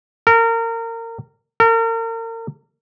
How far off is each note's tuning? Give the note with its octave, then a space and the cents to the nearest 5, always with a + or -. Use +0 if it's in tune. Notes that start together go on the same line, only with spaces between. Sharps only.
A#4 -30
A#4 -40